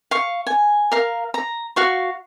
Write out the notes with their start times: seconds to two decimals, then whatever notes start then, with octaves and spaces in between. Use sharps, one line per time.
0.11 F5 C#6
0.47 G#5
0.92 A#4 F5
1.34 A#5
1.76 F#4 F5 C#6